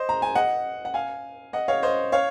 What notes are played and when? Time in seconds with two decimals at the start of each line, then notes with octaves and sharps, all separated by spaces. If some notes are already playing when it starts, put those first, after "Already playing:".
Already playing: C5 D#5
0.09 A#5
0.22 G#5
0.35 D#5 F#5
0.85 F#5
0.94 F5 G#5
1.53 D#5 F#5
1.68 C#5 F5
1.83 C5 D#5
2.12 C#5 F5